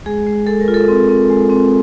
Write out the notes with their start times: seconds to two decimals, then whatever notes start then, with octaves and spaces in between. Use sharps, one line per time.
0.06 G#3 G#4
0.26 G#3
0.47 G#3 A4
0.60 A#4
0.68 F4
0.74 A4
0.88 C4
1.09 C4
1.30 G#3
1.50 C4